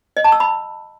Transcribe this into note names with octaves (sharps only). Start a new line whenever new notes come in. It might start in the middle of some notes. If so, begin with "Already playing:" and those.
D#5
A5
E6
B5